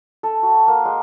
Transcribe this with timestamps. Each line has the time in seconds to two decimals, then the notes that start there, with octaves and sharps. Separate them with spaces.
0.23 A4
0.43 F#4
0.68 A#3
0.85 G#3